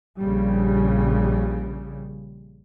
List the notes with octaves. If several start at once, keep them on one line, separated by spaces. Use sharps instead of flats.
A#1 C#3 G3